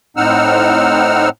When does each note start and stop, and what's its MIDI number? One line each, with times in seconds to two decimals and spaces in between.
0.17 1.29 45
0.17 1.29 60
0.17 1.29 63
0.17 1.29 78
0.17 1.29 88
0.17 1.29 89